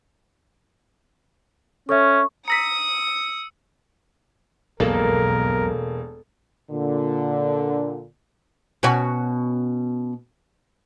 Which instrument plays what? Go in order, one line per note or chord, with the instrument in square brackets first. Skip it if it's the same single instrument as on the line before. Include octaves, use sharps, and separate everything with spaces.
[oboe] C#4 [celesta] A4 C#5 E5 [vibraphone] C#6
[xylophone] A#5 A#6 B6 [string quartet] D#6 [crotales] E6 C#7
[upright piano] E1 A#3 [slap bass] B1 F2 G#2 [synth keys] A4 [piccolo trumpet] A#4
[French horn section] A#2 D3
[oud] B2 C#4 F#4